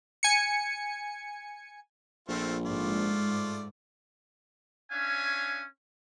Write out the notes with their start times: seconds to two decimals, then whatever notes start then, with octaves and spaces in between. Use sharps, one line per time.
0.23 G#5 C#7
2.28 A#1 A3 C4 F4
2.66 G#2 A3 F4 D5
4.91 C#4 D4 C#5 E5 F5 G#5